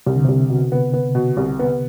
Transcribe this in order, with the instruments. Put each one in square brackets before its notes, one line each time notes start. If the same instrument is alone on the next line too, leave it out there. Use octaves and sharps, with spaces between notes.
[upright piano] C2 [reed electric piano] C3
[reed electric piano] D3
[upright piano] C2 [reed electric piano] C3
[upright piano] B2
B3
B3
B2
C2
B3